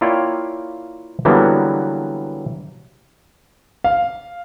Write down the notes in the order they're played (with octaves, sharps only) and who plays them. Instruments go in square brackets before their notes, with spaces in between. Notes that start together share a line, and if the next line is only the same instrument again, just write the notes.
[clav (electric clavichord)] A#3 E4 F4 C#5 D5 G5
D3 E3 F#3 G3 A#3 B3
[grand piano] F5